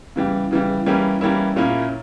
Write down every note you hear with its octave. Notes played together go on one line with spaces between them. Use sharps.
C#3 E3 G3
C#3 E3 G3
E3 G3 A#3 C#4 E4
E3 G3 A#3 C#4 E4
A#2 A#3 C#4 E4